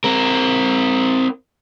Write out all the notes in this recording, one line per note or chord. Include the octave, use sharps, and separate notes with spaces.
C4 A#4